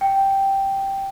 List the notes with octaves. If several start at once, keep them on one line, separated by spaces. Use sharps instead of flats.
G5